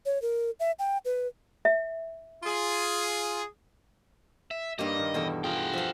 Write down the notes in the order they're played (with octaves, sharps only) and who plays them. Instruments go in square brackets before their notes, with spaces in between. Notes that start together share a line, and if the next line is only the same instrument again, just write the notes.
[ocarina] C#5
A#4
E5
G5
B4
[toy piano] E5
[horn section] F4 G#4
[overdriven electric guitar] E5
[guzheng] G2 G3 A#3 [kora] D#4 G4 C#5 [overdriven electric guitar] D#5
[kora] D#3
[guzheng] E2 B2 A4 [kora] G5
[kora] F4 G#4 [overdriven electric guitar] F#4 G5
[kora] F3 [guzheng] E5 F5